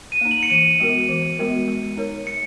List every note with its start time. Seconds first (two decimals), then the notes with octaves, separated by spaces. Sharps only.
0.12 D#7
0.21 A#3 D#4
0.31 F#7
0.43 C#7
0.50 E3 D#7
0.80 G#3 B3 F#4 A#4
1.09 E3
1.39 G#3 B3 F#4 A#4
1.68 G#3
1.97 D#4 A#4 C#5
2.26 G#3 C#7